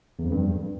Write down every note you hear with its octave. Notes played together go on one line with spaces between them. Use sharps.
E2
F2
G2